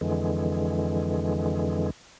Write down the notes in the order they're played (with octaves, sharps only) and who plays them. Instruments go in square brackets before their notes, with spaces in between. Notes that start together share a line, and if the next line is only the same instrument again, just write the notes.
[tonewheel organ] F2 D3 E3 G#3